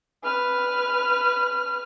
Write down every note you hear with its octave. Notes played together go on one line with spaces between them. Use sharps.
B4 F6